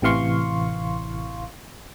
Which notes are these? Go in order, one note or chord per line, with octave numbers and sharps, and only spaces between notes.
A1 C3 E3 F5 C6 C#6